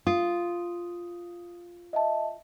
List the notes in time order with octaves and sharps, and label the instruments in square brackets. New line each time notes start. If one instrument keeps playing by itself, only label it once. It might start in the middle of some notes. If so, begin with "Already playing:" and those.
[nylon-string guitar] F4 [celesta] D#6
[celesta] D#5 E5 A5